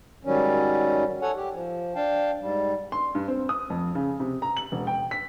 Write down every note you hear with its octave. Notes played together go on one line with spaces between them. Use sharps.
G#2 D#3 F#3 G3 C#4
A4 C#5 F#5 G#5
G4
F3
D4 F5 G5 A5
G#2 G3
C6
G2
C4
D#6
F2
C#3
C3
A#5
F#7
E1
G5
B6